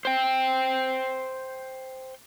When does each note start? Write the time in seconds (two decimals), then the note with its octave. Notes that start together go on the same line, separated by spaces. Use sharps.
0.05 C5 G5